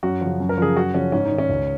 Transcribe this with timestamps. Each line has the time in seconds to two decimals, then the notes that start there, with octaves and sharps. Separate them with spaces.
0.03 F#2 F#4
0.21 C#3 F3
0.40 F#2
0.49 A#4
0.57 C#3 F3 G#4
0.76 F#2 F#4
0.94 C#3 F3 C#4
1.12 G#2 C#4
1.25 D#4
1.31 D#3
1.38 C#4
1.49 C#2